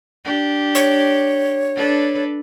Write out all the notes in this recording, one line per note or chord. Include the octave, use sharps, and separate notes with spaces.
D4 G4
C#5
D4 A4 B4